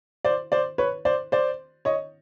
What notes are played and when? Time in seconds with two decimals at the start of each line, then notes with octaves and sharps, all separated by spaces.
0.25 C5 D5
0.52 C5 D5
0.78 B4 C#5
1.05 C5 D5
1.32 C5 D5
1.85 C#5 D#5